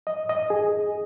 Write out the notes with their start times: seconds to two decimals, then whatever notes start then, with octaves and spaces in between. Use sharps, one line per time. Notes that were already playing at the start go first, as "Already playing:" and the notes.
0.07 D#5
0.29 D#5
0.50 G#4